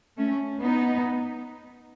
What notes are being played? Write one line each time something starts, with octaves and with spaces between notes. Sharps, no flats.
A3 C#4
B3 D#4